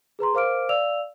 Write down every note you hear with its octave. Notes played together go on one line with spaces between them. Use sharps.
G#4 B4 A#5 C6
A#4 C5 F5 D6 F6 D7
D5 F5 E6 F7